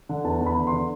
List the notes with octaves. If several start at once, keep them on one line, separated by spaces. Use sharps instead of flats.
D3
E2 A5
E2
B5
D3
C6
D3